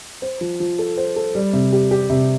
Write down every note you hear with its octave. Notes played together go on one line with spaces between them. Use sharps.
C5
F3
F3
A4
C5
A4
G3
C3
G4
G4
C3